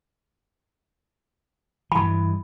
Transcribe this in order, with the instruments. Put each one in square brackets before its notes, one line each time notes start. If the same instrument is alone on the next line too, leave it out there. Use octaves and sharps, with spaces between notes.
[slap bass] G2 E3 [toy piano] B5